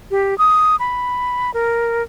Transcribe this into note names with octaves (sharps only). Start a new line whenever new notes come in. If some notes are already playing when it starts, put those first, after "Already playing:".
G4
D#6
B5
A#4